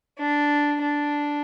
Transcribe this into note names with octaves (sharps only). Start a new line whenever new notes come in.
D4
D4